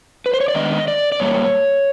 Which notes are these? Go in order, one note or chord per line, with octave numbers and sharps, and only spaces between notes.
B4
C5
C#5
D5
D#3 G#3 B3 D4 D#5
D5
D5
A#2 G3 A#3 C#5